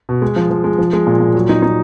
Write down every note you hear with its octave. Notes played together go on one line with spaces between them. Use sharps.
B2
G#3
F3
F3
G#3
F3
G#3
A#2
A#2
F#3
D#4
D#4